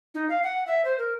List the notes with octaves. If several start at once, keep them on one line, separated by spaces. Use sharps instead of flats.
D#4
F5
F#5
E5
C5
A#4